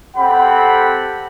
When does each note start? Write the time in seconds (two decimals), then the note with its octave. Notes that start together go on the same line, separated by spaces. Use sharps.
0.17 C4 G4 A4 F#5 B5